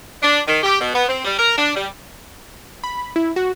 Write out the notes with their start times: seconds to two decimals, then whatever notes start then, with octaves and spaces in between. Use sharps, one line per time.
0.22 D4
0.47 D#3
0.63 G4
0.79 B2
0.94 B3
1.08 C4
1.24 G3
1.38 A#4
1.57 D4
1.75 G3
2.84 B5
3.16 E4
3.36 F#4